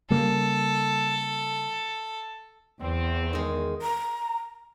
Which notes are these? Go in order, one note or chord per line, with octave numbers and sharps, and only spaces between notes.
C#3 G3 A#3 A4
E2 C4
D#3 G#3
A#5